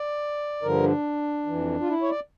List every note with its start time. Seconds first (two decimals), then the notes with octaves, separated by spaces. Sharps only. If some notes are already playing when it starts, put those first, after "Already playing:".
Already playing: D5
0.62 G2 D3 F3 A#4
0.83 D4
1.46 F2 E3
1.81 F4
1.89 E4
2.02 C#5
2.09 D5